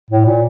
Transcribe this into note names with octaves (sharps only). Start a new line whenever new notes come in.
A2
A#2